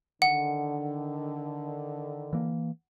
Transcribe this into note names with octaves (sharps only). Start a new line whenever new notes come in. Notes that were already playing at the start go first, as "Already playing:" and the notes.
D3 D#3 F#5
E3 A#3